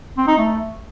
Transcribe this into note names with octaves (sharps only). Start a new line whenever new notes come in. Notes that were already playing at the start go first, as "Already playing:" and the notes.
C4
D#4
A3